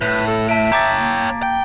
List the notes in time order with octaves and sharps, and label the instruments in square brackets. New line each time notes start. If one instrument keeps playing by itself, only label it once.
[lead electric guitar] A2 [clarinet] B4
[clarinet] A4
[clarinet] E5 [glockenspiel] A5 B6 D7
[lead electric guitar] C#5 G5 [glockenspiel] A#5 D6 A6
[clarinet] A#3
[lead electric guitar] G5